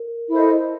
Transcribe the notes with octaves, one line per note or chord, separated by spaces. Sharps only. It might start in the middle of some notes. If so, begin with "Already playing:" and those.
Already playing: A#4
E4 A4 C5 D#5